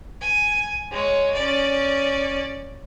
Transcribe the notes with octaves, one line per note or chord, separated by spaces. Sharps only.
G#5
G#3 C#5
C#4 D5